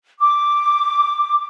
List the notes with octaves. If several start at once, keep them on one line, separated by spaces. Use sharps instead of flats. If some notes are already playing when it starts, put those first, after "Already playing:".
D6